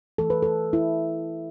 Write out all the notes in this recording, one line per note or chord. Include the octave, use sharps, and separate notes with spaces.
E3 A3 A4
B4
A4
E4